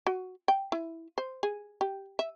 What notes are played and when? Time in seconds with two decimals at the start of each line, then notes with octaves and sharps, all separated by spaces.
0.07 F#4
0.48 G5
0.72 E4
1.18 C5
1.43 G#4
1.81 G4
2.19 E5